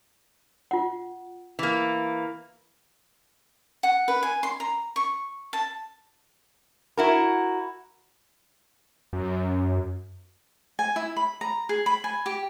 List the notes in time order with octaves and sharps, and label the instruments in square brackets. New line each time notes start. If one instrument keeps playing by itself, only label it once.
[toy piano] F4 F#5
[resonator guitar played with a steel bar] E3 A#3
[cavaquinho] F#5
B4
G#5
C6
A#5
C#6
A5
[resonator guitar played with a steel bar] E4 F#4 A#4
[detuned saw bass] F#2
[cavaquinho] G#5
E4
B5
A#5
G#4
B5
G#5
G4